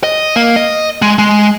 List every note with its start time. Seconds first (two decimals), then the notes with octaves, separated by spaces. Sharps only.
0.04 D#5
0.36 A#3
0.56 D#5
1.02 G#3
1.18 G#3